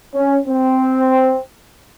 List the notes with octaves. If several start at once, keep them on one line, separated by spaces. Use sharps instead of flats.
C#4
C4